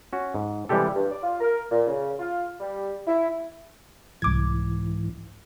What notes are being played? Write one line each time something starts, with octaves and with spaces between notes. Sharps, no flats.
C#4 F#4
G#2
C3 E3 G3 G#3 G4 A4
G2
D5
F4
A#4
A#2
C#3
F4
G3
E4
C2 G#2 E3 D6 G#6